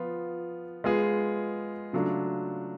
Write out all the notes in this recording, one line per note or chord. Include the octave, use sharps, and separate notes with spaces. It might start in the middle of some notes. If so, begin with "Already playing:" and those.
Already playing: F3 B3 F4
G#3 B3 F4 G#4
C#3 F#3 A3 D4 F4